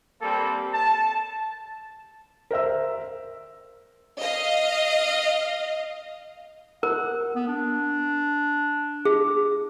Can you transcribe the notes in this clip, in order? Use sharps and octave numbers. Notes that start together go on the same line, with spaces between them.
G3 A#3 C4 A4
A5
A#4 C5 E5 E6
D#5 F5
A#4 F#5
B3
D4
G#4